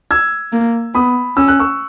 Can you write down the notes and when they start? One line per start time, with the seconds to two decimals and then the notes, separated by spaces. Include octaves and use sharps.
0.11 E6 G#6
0.53 A#3
0.94 B3 B5 D#6
1.37 C#4 E6
1.48 F#6
1.60 C#6 E6